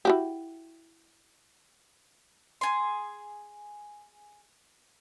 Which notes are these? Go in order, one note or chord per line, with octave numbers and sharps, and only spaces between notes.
E4 F#4 G4
G#4 C6